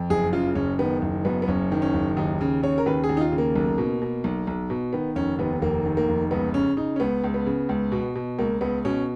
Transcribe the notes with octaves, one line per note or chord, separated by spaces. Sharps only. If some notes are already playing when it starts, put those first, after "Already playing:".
Already playing: F2
F#1 G#4
C#3 F4
F#1 C#4
D#3 B3
F#1
F#2 B3
B3
F#1 C#4
D#3
C#4
F#1
D#2 D#4
C#3
C#3 C#5
A#4
D#2 B4
G#4
D#2
D#4
F4
C#3
A#3
B1
B2
B2
B1
B1
B2
D#3 B3
F1 C#4
D#2 B3
F1 A#3
D#3
A#3
F1
C#2 B3
C#3 C#4
C#3 D#4
C#4
C#2 B3
C#2
B3
C#3
C#2
B2
B2
C#2 A#3
C#2 B3
B2 C#4